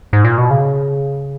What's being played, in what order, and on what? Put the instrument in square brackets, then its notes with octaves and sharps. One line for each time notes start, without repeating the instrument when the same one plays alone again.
[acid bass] G#2
A#2
B2
C#3